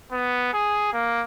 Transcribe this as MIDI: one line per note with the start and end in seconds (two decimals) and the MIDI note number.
0.12 0.51 59
0.53 0.93 68
0.93 1.22 58